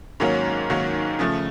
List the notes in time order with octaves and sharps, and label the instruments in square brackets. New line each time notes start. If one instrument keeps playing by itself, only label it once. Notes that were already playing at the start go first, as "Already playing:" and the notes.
[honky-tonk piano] G#2 D#3 F#3 A#3 C#4
G#2 D#3 F#3 A#3 C#4
C#3 F3 A3